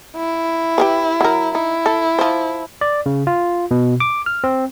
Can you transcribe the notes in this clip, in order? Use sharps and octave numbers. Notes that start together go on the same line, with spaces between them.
E4
G4 G#4 B4
F#3 A#4
D#4 E4
A4
F3 C5
D5
C#3
F4
B2
D6
F6
C4